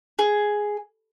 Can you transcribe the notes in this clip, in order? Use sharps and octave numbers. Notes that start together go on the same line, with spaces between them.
G#4